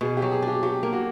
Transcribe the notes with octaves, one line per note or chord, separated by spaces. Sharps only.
B2 G#4
G4
F#3
G#4
D4
G4
F#3 G4
A#3
F#4